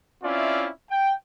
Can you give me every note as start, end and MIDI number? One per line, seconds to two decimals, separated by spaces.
0.23 0.69 60
0.23 0.69 61
0.23 0.69 64
0.23 0.69 65
0.23 0.69 74
0.23 0.69 76
0.90 1.14 79